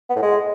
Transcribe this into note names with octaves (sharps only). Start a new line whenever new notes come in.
B3
A2
G#3